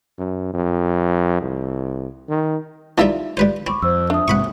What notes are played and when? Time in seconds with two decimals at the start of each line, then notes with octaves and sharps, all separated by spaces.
0.19 F#2
0.54 F2
1.41 C2
2.29 D#3
2.98 E3 G3 D#4 F4 E5
3.37 G3 B4 C5
3.67 C4 B5 C#6 D6
3.82 F2 C5 E6
4.10 D4 E5 D#6
4.28 G#2 C3 F#5 B5 C#6